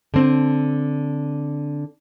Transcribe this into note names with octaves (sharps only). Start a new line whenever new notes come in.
D3 C4